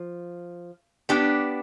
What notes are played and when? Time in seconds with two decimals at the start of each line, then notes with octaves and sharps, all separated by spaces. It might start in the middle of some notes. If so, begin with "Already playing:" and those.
Already playing: F3
1.09 B3 D4 G4